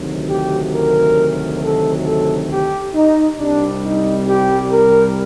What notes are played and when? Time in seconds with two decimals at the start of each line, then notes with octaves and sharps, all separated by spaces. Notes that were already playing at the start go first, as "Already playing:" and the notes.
Already playing: D2 C3 D#3 F#3
0.29 G4
0.74 A#4
1.62 A4
2.06 A4
2.51 G4
2.95 D#4
3.39 C2 C3 G3 D4
3.84 D#4
4.28 G4
4.72 A#4